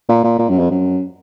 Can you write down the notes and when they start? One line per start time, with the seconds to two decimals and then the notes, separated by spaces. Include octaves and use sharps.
0.08 A#2
0.24 A#2
0.39 A#2
0.49 F#2
0.59 F2
0.70 F#2